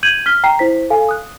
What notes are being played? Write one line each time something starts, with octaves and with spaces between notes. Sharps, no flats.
G6 G#6 D#7 F#7
F6 B6 G7
G5 A#5 C7
E4 C5 B6
A4 F5 G#5
D#6 F#6